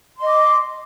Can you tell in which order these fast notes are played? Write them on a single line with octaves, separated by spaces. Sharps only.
C6 D#5 D6